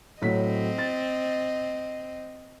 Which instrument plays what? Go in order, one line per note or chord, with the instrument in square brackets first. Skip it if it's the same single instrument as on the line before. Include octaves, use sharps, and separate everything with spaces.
[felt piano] A2 F#3 B6 [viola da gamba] C4 D#5
[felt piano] A6